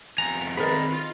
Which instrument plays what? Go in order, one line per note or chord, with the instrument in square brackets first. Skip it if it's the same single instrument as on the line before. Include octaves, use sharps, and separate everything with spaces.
[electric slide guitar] F2 B3 G#5 [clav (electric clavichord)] A#5
[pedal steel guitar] D#3 C4 B5 [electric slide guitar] G#4 D5 D#5 [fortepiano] A#4 B4
[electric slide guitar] F4